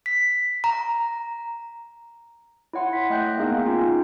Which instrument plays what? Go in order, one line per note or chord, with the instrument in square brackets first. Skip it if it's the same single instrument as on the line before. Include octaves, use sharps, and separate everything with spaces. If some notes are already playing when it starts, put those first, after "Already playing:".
[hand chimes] B6
A#5
[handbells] E4 C#5 F#5 C6
B6
A3 D#5 G5 F#6 G6
A#3 B3 D#4 G#4 F5
C#4 D#4 F4 G#4 G5